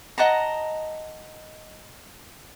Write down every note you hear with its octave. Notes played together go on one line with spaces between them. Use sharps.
D#5 F#5 A5 A#5